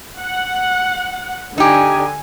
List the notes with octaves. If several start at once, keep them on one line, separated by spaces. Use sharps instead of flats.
F#5
D3 D#4 G4 G#5